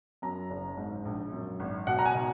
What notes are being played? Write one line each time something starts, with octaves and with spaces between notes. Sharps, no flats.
F#2 A#5
F#1
G#2
A#1
F#2
G#1
B2 F#5
A#5
G#5
B2